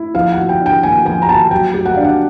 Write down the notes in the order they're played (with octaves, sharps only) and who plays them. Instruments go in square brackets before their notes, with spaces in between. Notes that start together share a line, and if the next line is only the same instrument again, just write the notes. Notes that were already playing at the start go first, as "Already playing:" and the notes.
Already playing: [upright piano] E4
[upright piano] F3 [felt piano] F5
[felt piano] F#5
[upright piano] F#4
[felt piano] G5
[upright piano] D4
[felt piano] G5
[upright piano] A#3 [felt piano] G#5
[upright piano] F3 [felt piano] G#5
[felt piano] A#5
[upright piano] F#4 [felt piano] A5
[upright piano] F#3 [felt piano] G5
[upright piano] G4
[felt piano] F#5
[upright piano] D4 [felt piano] F5
[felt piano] F#5